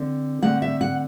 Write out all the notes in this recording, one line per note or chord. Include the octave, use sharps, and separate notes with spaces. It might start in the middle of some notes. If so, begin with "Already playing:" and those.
Already playing: D3 C4
D3 A3 C4 F#5
E5
F#5